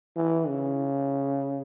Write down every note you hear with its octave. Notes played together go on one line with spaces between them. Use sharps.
E3
C#3